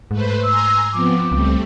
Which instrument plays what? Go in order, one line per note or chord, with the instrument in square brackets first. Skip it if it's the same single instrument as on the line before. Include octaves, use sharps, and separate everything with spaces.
[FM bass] G#2 [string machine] A3 B4 C5
[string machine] G#5 A#5 C6 [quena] E6
[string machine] F3 B3 C4 [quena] D6
[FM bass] C#2 [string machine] G3 A3 C4